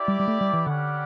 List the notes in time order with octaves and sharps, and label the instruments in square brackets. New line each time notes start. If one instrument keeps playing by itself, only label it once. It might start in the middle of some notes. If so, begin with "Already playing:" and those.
Already playing: [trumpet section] E4 G4 D5
[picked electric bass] G3
G3
A3
G3
E3
[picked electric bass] D3 [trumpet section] G3 C#4 G4 D5 F#5